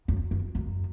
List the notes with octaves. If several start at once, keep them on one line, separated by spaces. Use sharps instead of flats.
F#2
F#2
F#2